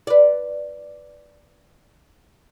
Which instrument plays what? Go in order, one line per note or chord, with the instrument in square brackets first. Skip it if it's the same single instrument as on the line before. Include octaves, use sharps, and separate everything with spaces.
[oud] B4 D5